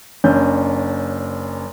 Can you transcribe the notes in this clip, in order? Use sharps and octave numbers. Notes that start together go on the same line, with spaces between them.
F#1 C#4 D4 G6